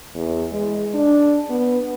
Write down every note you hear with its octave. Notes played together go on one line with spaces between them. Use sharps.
E2
G#3
D4
B3